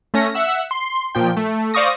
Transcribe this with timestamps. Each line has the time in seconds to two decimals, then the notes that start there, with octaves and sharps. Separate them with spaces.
0.14 A3 C#4 A#6
0.35 E5 F#5 E6
0.71 C6
1.15 A#2 F3 G5
1.37 A3
1.74 C5 D5 F5 C#6 D#6 A#6